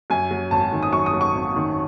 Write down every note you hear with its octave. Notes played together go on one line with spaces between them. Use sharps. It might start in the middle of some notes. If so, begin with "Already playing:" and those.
F#2 G#5
F#3
G#1 A5
D#3
D#6
F#2 C#6
D#6
F#3
C#6
G#1
D#3